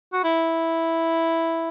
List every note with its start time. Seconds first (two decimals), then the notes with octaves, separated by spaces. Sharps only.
0.13 F#4
0.24 E4